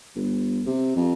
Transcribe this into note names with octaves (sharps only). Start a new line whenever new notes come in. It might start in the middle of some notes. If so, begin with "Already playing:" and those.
G1
C3
F2